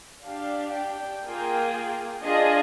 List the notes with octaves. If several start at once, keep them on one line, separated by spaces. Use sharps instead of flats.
D4 G4 F5
G5
A#3 F4 G#4
D4 F4 G#4 D#5